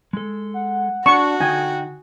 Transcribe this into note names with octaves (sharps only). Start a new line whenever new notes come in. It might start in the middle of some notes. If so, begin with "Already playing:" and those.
G#3 A4
F#5
D4 F#4 C#6
D3 D#4 G5 G#5